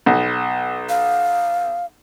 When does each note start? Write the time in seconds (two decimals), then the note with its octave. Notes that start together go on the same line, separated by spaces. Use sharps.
0.06 B1
0.89 F5